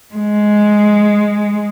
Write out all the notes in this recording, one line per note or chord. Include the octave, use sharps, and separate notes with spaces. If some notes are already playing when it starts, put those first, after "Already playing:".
G#3